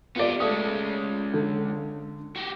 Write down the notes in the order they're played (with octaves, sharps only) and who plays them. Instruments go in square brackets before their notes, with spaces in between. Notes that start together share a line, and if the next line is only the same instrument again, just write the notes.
[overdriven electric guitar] B3 G4 [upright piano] F4 D5
[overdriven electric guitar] G#3 C#4 [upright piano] A3 D#6
[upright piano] D3
[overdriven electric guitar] F#4 G4